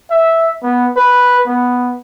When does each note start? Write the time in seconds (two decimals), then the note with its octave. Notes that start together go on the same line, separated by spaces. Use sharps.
0.10 E5
0.63 B3
0.97 B4
1.46 B3